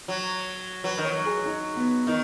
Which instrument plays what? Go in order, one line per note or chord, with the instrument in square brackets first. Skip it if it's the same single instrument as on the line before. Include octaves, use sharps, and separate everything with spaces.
[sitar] F#3
[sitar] F#3 [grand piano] B4
[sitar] D#3
[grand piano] C#5
[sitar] F#3
[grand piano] G#4
D#4
B3
[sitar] D#3 [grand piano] D#4